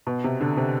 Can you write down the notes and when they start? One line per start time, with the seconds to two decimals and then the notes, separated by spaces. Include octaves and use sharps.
0.07 B2
0.24 C3
0.41 D3
0.57 C3